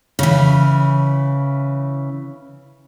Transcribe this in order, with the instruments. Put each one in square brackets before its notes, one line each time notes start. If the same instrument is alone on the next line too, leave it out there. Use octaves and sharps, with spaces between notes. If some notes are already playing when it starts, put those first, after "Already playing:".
[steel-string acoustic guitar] C#3 E3